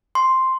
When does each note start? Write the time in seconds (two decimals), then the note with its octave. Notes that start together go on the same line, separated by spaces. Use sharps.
0.15 C6